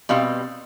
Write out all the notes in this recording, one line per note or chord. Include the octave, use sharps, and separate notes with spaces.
B2 G3 C4 F5